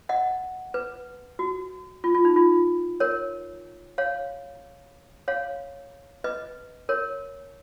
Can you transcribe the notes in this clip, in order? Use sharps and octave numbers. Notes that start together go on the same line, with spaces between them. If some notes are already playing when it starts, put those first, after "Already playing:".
D#5 F#5
B4
F#4
F4
F4
D#4
F4
A#4 C#5
C#5 F5
C#5 F5
B4 D#5
A#4 C#5